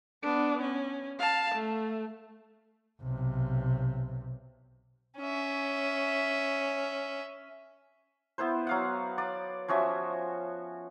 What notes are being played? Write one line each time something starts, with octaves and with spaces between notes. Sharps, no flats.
B3 D4
C#4
F5 A5
A3
B1 C3
C#4 E5
B3 E4 B4 C5
F#3 F5 F#5
D5 D#6
F3 C#4 F#4 E5